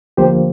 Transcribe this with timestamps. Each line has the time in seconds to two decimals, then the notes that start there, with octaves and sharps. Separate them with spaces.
0.17 D2 D3 F3 A#3 G4 C5